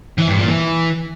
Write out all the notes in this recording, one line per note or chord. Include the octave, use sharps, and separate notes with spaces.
E3
G2
A#2
E3